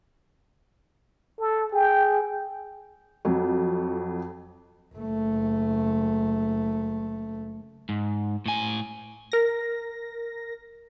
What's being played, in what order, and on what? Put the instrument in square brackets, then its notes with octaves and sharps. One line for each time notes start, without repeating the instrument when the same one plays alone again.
[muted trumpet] A4
[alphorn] G#4 [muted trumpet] G5
[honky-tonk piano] F2 [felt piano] F#3
[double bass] F#1 A3
[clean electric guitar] G#2
A2 G#5
[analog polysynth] A#4 A#6